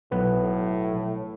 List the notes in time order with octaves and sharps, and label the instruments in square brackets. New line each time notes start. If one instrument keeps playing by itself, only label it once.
[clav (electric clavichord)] B1 B3 B4 [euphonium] A2